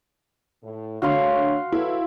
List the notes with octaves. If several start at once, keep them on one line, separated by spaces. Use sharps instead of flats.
A2
D3 A3 F#4 C#5 F5 C6
F#3 E4 A4 B4